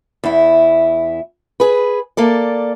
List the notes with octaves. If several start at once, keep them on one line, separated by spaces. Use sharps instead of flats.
E2 E4
G#4 B4
A#3 A4 D5